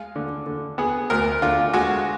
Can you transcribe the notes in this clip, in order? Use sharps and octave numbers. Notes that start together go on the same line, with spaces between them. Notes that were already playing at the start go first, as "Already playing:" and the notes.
Already playing: G#3 F5
D3
D3
B3 G#4
D2 A#4
D3 F4
G#3 F#4